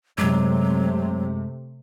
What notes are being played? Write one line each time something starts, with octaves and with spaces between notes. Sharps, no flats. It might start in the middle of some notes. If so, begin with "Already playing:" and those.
F#2 C3 F#3 G#3 A3 D6